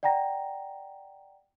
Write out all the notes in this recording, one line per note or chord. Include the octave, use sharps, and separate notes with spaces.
D5 F#5 G5 A#5 A#6